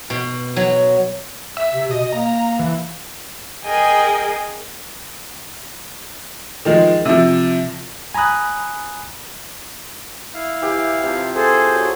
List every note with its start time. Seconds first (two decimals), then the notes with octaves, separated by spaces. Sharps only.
0.10 B2
0.56 F#3
1.57 E5
1.74 C3
1.91 B2 D#5
2.12 A#3 A#5
2.59 E3
3.64 G#4 A#4 D#5 G5 G#5
6.65 D#3 F3 G#3
7.05 C3 F3
8.14 G#5 A#5 B5 D#6 F#6
10.34 E4 F5
10.62 E3 G4
11.03 C3 F3
11.35 G#4 A4 C5
11.75 F#3